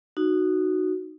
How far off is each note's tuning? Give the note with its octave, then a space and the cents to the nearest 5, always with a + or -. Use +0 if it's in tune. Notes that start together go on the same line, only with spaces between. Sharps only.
D#4 -15 F#4 +0